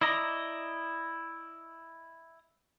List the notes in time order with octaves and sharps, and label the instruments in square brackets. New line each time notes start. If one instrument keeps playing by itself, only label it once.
[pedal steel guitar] E4 D5 D#5 A#5